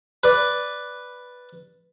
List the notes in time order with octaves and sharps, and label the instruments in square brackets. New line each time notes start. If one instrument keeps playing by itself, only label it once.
[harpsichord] B4 D5